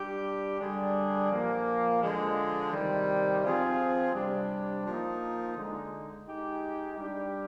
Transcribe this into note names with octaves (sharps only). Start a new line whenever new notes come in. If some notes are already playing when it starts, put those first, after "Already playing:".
Already playing: G3 D4 G4
D3 G3 D4 G#4
A#2 F3 A#3
D3 F3 G#3
C3 D#3 G3
F3 C4 F4 G#4
C3 G3 D4
F3 A#3 D#4
D3 G#3 D#4
G#3 D#4 G4
G3 D4 G4